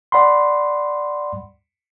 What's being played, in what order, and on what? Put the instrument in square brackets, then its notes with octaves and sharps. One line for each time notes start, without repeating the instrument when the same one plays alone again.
[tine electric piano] D5 F#5 B5 C6